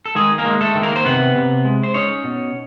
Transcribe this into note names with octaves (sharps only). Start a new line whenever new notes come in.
A4
D#3 G#3 G#4
A#3 A#4
G#3
A3 A4
D#3
A#3 A#4
C5
C3 B3 B4
C3
G#3
C5
C#4 D#4 C#5
B2